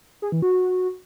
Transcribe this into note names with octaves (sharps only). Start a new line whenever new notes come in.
G#4
E3
F#4